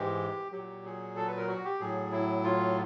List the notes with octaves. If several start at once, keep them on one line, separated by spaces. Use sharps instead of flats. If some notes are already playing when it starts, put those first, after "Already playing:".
Already playing: G#2 E3 G#3 G4
A#2 F#3 G4
G#4
A4
B4
A#4
F#4
G4
A2 F#3 G#4
E4
F4